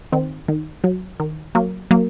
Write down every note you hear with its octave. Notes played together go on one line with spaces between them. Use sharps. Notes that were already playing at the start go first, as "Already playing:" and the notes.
D#3 C4
D#3
F#3
D#3
F#3 A#3
F#3 A#3